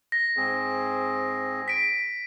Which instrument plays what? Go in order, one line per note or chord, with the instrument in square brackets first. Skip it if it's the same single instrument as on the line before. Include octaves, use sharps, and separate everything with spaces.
[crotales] A#6
[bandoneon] G#2 C4 G#4
[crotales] B6 D7